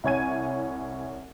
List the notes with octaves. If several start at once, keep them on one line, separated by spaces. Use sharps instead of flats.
C2 E4 C#5 G#5 G#6 D#7